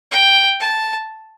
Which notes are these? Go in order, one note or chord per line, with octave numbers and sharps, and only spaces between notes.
G5
A5